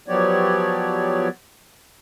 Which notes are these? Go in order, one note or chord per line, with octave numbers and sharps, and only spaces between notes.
F3 F#3 B3 G4 C#5 D5